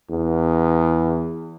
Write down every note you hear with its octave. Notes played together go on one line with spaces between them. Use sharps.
E2